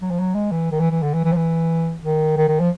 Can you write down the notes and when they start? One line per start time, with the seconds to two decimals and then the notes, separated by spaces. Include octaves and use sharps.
0.02 F#3
0.11 F3
0.20 F#3
0.35 G#3
0.52 E3
0.72 D#3
0.80 E3
0.91 E3
1.02 D3
1.14 E3
1.24 E3
1.32 F3
1.36 E3
2.04 D#3
2.37 D#3
2.48 D#3
2.60 F3